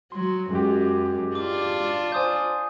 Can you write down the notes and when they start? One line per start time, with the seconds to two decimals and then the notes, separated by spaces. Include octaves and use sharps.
0.12 F#3 C6
0.51 F#2 G#3 F#4 G4
1.35 D4 F4 D6
2.12 C5 D5 G#5 D#6 G6